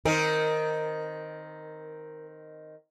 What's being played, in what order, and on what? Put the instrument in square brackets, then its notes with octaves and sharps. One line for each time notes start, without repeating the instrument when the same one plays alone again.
[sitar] D#3 C4 [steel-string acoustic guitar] A#4